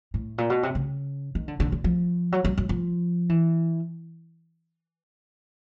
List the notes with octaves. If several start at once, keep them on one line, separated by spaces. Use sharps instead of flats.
A2
A#2
B2
C3
C#3
D#3
D3
D3
D3
F3
F#3
F#3
F#3
F3
E3